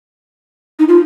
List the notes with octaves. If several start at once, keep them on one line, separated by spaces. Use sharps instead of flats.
D#4
F4